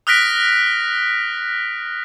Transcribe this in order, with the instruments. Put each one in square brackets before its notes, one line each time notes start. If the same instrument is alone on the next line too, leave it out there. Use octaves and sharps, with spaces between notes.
[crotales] D#6 F6 F#6 A#6 B6 D7